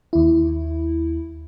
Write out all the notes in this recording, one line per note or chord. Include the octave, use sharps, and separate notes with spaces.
D#2 E4